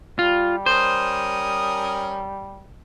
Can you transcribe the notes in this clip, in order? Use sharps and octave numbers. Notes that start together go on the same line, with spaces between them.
G3 F4
C#4 A#4 C5 D#6